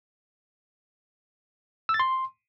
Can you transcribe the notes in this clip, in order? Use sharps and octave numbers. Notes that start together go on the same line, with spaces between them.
E6
A6
C6